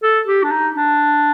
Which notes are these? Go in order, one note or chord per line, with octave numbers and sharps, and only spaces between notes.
A4
G4
D4
D#4
D4